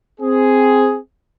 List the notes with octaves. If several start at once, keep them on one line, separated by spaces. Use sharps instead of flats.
C4 G#4